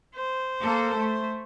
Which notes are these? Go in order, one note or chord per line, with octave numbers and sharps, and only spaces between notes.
C5
A#3 A4
A3